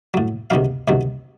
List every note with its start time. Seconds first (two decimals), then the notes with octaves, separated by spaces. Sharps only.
0.14 A2 F#3
0.50 C#2 C3 D#3 F#3 F5
0.88 C#2 C3 D#3 F#3